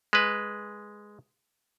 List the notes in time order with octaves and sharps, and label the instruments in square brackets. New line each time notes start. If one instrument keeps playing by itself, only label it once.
[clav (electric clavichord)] G#3 B4